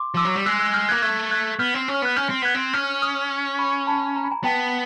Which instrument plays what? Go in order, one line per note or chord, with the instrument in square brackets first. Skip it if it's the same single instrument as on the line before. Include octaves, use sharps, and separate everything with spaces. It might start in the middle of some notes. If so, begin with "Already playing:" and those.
Already playing: [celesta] C6 D6
[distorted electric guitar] F3 [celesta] D6 E6
[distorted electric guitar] F#3
G3
[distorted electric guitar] G#3 [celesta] E6 F#6
[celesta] E6 F#6
F6 G6
[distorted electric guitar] A#3 [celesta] F#6 G#6
[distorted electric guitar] A3 [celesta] F#6 G#6
[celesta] F#6 G#6
[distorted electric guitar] B3 [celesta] F6 G6
[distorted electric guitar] C4
C#4
[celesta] F6
[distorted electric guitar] B3 [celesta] F#6
[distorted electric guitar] C#4 [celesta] F6 G6
[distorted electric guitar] C4
[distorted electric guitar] B3 [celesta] F#6 G#6
[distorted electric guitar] C4
[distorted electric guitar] C#4 [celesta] F6 G6
[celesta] D#6 F6
B5 C#6
A5 B5
A#5
B5
G#5 A#5
[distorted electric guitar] B3 [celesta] G5 A5